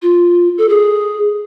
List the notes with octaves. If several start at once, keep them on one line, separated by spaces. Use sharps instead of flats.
F4
A4
G#4